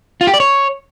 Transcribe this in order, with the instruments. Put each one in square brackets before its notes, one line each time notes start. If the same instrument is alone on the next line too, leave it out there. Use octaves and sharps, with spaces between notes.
[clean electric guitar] F4
G4
D5
C#5